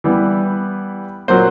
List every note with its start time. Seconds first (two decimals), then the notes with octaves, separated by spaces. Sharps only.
0.04 E3 G3 B3
1.28 A#2 F#3 A#3 C5